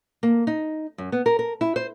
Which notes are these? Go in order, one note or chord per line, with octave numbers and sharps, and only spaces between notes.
A#3
D#4
F#2
B3
A#4
A#4
E4
C5